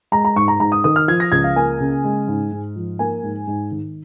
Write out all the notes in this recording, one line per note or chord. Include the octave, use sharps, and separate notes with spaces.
G#3 A#5
A#5
G#2 C#6
A#5
G#2 A#5
D#6
D#3 D#6
F6
F3 G#6
A#6
C#2 G#6
F5
A#3 G#5
C#3
G#3
G#2
G#2
F3
A#3 G#5
G#2
G#2
D#3